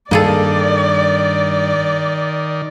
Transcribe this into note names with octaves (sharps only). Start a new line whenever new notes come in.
G2 D#3 A#3 G#4 A4 D5